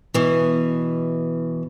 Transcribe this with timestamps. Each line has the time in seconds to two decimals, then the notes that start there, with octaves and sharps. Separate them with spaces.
0.14 B2 E3